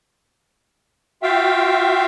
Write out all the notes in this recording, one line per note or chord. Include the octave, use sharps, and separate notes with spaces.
F4 F#4 E5 F5 G5